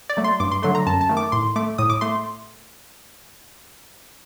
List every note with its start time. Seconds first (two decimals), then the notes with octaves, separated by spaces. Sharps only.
0.10 D5
0.17 F#3 A3
0.24 C6
0.40 G2 D6
0.52 C6
0.62 D3 F#3 A3 C6
0.75 A#5
0.87 F#2 A5
1.01 A5
1.09 D#3 A3
1.17 D6
1.32 A2 C6
1.56 A3 D6
1.78 A2 D#6
1.90 D6
2.01 A3 C6